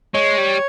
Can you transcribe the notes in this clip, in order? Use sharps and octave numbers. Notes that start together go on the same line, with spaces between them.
G#3 C#5
G3